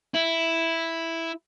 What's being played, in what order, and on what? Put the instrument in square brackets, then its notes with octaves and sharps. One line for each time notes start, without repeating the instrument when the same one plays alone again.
[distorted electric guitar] E4